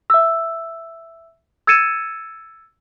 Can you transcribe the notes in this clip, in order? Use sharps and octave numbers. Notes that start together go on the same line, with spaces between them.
E5 E6
E6 G#6 A6 C#7 D#7 E7